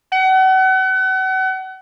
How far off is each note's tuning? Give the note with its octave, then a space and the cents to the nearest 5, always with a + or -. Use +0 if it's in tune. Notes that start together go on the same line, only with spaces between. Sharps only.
F#5 +35